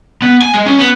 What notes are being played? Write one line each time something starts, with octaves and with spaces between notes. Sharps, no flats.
B3
G#5
G#3
C#4
B3